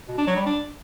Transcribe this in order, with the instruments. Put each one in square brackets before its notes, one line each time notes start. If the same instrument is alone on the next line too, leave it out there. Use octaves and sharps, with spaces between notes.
[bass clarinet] B2
D4
F#3
G3
D4